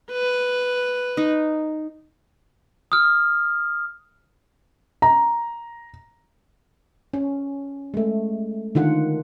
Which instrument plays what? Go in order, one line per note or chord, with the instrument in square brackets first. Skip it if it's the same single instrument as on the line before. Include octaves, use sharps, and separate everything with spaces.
[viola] B4
[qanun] D#4
[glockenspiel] D#6 F6
[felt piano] A#5
[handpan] C#4
G#3 A3
D3 D#3 F4 F#5